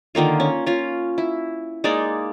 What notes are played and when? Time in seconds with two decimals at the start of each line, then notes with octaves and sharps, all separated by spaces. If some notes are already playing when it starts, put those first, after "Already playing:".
0.15 D3 D#3 A#3 F4
0.40 C#4
0.66 C#4 F4
1.18 E4
1.84 G#3 A#3 D#4 D5